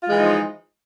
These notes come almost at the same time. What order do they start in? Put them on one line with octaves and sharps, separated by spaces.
F4 G#3 E3 D#4 F3